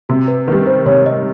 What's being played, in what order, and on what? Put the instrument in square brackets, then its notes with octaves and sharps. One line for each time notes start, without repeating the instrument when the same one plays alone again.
[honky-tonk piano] C3 [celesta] F#4
[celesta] B4
[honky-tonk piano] D#3 G3 [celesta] B4
[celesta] C5
[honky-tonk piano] C3 [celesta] C#5
[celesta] D#5